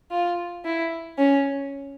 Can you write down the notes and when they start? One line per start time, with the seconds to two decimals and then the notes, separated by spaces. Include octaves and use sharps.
0.11 F4
0.65 E4
1.18 C#4